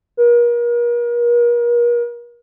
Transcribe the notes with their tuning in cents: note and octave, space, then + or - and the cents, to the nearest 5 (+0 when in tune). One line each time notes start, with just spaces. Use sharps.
A#4 +40